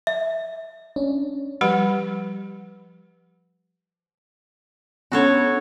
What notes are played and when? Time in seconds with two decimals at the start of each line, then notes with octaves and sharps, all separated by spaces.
0.07 E5
0.96 C#4 D4
1.61 F3 G3 G4 B4 B5
5.12 B3 C#4 D4 F#4 A4 C#5